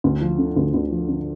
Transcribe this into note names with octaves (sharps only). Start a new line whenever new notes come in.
D2
F3
D3
D2
D2
F3
D3